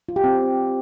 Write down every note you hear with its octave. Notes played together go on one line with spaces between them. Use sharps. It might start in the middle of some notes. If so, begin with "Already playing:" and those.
F4
G4
C4